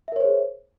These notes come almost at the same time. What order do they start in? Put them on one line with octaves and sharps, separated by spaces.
E5 A#4 C#5 C5 G#4